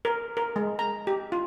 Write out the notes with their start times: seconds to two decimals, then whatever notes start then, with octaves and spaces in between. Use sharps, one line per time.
0.05 A#4
0.37 A#4
0.56 G#3
0.79 A#5
1.07 G4
1.32 F4